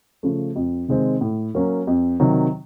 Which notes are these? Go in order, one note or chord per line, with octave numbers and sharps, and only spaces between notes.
C#3 F3 A3
F2
C3 D#3 G#3 C4
A2
F#3 A#3 C#4
F2
C3 D#3 F#3